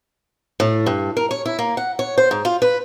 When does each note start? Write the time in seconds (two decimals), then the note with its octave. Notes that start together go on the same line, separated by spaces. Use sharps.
0.60 A2
0.87 G2
1.17 A#4
1.31 C#5
1.46 E4
1.59 A#3
1.77 F#5
1.99 C#5
2.18 C5
2.31 G#2
2.45 F4
2.62 B4